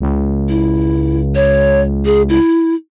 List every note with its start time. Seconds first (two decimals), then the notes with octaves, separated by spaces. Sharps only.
0.01 C#2
0.49 E4
1.35 C#5
2.05 G#4
2.29 E4